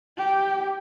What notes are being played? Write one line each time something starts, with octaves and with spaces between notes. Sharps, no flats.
G4